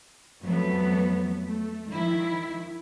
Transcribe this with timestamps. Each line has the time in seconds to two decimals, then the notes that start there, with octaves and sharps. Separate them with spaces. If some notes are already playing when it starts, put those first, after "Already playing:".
0.43 F2 F#3 A3 B3
1.47 A3
1.91 D#3 F3 E4